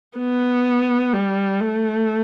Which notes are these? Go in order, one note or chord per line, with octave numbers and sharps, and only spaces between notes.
B3
G3
A3